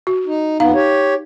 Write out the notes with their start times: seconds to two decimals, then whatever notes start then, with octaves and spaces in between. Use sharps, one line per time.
0.07 F#4
0.27 D#4
0.60 F2 B3 D#4 F5
0.74 G4 C#5